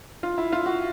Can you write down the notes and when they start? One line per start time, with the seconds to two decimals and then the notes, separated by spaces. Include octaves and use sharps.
0.23 F4
0.38 E4
0.52 F4
0.66 F#4